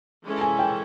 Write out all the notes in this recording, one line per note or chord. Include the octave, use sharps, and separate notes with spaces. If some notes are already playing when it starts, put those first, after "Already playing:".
E3 G#3 C#4 E4 A4
G#5
G5